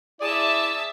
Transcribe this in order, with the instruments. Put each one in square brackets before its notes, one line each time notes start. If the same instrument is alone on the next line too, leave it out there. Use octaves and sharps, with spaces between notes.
[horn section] E4 G#4 D5 [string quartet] E5 A5